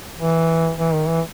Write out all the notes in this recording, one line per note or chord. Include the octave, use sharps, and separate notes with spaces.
E3
E3
D#3
E3